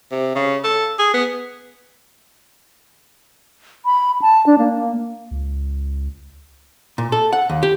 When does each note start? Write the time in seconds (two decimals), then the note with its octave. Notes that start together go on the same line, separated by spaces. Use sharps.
0.12 C3
0.35 C#3
0.64 A4
0.99 G#4
1.14 B3
3.85 B5
4.22 A5
4.46 D4
4.59 A#3
5.31 C#2
6.98 A#2
7.12 A4
7.33 F#5
7.50 D#2
7.63 G4